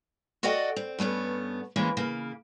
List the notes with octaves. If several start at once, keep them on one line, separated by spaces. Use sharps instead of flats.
F#4 A4 D5 D#5 F#5 G5
C4
G2 A3 B3 C#4
E3 G#3 A#3 C4 C#4
C#3 A#3